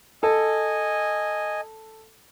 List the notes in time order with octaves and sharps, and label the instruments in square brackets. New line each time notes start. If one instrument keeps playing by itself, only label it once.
[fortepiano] A4 [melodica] D#5 G#5